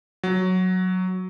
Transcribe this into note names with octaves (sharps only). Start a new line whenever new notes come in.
F#3